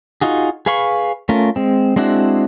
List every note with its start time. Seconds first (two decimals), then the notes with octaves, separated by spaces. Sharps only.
0.21 D#4 F4 F#4 G#4
0.66 G#4 B4 F5 B5 C#6
1.29 A3 C#4 F4 A#4
1.56 G#3 C4
1.96 G#3 C4 D4 E4 F#4